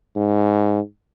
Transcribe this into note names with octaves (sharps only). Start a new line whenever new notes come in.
G#2